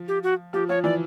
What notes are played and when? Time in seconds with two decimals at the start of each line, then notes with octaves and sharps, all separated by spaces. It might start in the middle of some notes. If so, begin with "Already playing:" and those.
Already playing: F3
0.08 G4
0.23 F#4
0.53 F3 G4
0.69 F3 C#5
0.84 E3 D5